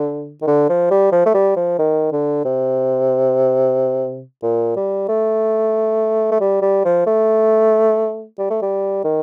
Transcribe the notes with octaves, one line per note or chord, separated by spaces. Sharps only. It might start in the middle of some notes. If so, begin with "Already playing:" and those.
Already playing: D3
D#3
D3
F3
G3
F3
A3
G3
F3
D#3
D3
C3
A#2
G3
A3
A3
G3
G3
F3
A3
G3
A3
G3
D#3